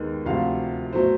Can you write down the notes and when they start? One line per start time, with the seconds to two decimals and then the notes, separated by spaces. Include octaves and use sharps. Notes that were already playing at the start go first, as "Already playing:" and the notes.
Already playing: D#2 D#3 G#3 B3 D#4
0.26 D2 C3 F3 A3 F5
0.93 B2 F#3 A3 C5